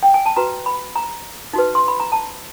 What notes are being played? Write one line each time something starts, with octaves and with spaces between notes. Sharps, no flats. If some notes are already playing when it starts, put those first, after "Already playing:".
G5
G#5
A5
F#4 B4 A#5
B5
A#5
D#4 F#4 B4
C6
B5
A#5
A5